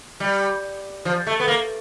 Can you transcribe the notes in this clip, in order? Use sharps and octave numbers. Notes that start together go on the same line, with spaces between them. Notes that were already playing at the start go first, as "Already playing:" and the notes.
G3
F3
A3
B3
A#3